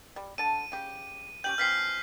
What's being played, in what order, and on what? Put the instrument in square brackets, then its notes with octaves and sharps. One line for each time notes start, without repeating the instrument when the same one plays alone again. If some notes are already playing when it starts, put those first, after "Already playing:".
[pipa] G3
[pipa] D3 A5 [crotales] D#7
[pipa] C#3 G4
[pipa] C#4 G4 G5 [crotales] G6 F#7
[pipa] E3 F3 C4 [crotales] F6 B6 C7